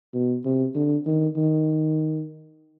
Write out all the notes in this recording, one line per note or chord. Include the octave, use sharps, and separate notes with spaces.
B2
C3
D3
D#3
D#3